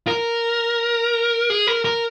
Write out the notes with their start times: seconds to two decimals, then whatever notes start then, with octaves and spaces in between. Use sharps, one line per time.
0.07 A#4
1.50 G#4
1.67 A#4
1.85 A#4